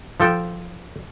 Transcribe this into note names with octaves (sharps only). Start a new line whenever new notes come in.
F3 A4 G5